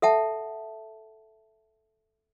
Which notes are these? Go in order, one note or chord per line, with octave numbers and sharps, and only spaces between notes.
A4 E5 F#5 A5